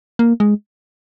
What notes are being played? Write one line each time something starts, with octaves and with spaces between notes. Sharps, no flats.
A#3
G#3